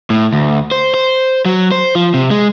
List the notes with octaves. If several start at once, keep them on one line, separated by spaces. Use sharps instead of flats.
A2
D2
C5
C5
F#3
C5
F3
C3
G#3